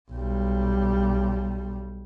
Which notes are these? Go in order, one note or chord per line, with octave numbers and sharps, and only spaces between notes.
B1 G3